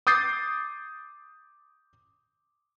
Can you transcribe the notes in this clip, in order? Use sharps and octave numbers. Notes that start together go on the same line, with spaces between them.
D6 D#6 G6 A6 C7